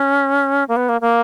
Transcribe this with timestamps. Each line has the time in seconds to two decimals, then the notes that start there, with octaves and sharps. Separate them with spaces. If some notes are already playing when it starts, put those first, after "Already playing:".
Already playing: C#4
0.68 A#3
0.76 B3
0.89 A#3
1.01 A#3